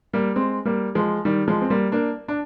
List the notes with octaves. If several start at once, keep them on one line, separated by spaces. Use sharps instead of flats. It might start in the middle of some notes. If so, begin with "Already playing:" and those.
G3 A#3
G#3 C4
G3 A#3
F3 G#3
D#3 G3
F3 G#3
C4
G3 A#3
A#3 D4
D4